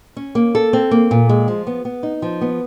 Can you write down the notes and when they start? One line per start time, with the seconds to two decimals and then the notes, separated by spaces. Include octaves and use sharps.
0.17 C#4
0.35 A#3
0.55 A4
0.73 C4
0.91 A#3
1.11 A#2
1.29 G#3
1.48 F3
1.67 B3
1.85 B3
2.03 D#4
2.22 F3
2.41 B3